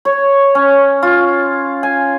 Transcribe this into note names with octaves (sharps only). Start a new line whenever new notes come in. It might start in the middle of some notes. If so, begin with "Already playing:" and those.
C#5
C#4
F4
G#5